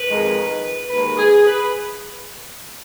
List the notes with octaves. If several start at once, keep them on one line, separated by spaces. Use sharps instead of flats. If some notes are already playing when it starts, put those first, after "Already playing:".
Already playing: B4
F2 D#3 G#3
D#2 D#3 G#3 B4
G#4
B4